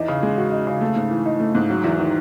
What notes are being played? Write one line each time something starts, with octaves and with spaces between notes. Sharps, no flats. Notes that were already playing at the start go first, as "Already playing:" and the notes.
Already playing: E2 D#4
C#3
G#3
F#4
D#4
C#3
A3
G#2
E3
D#4
A3
G#2
F#3
E2
D#3